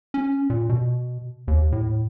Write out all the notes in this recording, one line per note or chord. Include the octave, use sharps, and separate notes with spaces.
C#4
A#2
B2
D#2
A2